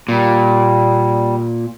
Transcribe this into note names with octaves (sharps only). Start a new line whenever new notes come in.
A#2 G3